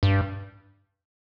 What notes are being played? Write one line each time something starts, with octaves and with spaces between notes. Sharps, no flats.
G2